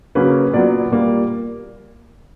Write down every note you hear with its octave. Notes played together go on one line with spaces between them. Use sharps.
C#3 F#3 A#3 C#4 B4
A#2 F#3 B3 D5
A#2 G3 A#3